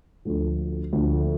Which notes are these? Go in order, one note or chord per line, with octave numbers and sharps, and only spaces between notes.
D2 D3 F3
D2 D3 F3